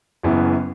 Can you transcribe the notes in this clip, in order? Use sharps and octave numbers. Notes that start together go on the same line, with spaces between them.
F#1 F#2 E3 B3